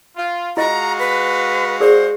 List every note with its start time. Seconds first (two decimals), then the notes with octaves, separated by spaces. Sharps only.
0.16 F4
0.57 G#3 F4 F#4 D#5 F5 A#5
0.99 B4
1.80 G#4 A#4 C5 D5